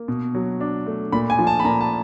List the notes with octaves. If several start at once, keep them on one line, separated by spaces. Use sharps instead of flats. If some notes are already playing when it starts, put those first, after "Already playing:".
Already playing: A#3
B2
F#3
D4
A3
A#2 B5
G#5
F3
A5
B5
A#2 A#5
A5